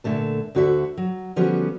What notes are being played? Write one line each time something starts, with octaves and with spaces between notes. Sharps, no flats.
A#2 D3 A3 A5
D2 D3 F#4 C5 D5 E5
F#3
D3 F3 G3 B3 C#4 F#4